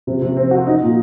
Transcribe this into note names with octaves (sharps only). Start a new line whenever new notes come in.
C3
C3
C4
F#4
D#4
A#2